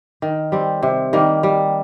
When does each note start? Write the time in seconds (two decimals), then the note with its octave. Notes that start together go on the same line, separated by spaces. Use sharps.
0.22 D#3
0.52 G3 C4
0.83 C3
1.13 D#3 G3 A#3
1.43 G3